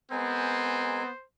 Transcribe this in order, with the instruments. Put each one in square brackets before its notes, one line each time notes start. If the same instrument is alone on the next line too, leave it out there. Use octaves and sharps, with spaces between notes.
[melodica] G#3 A#4 G#5 [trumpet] B3 [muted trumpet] C4 [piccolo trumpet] C5